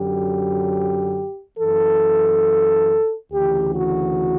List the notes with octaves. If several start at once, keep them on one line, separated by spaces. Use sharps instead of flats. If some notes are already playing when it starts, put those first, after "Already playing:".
Already playing: F#2 D3 F#3 G4
F#2 E3 A4
D2 C#3 E3 G4
F#4